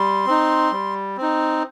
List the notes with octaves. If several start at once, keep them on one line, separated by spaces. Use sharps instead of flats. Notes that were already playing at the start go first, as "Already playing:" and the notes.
Already playing: G3 C6
C4 D#4
G3
C4 D#4